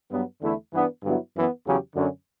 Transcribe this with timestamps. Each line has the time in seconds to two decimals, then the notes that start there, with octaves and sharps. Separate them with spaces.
0.11 G2 F#3 B3
0.42 E2 D3 A3 E4
0.72 G2 E3 B3 D4
1.03 G2 D3 F#3 B3 E4
1.34 F#2 E3 B3
1.65 E2 C#3 F#3 C#4 G4
1.95 F#2 D3 F#3 C#4